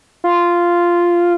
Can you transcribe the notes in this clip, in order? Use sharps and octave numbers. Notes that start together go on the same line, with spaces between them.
F4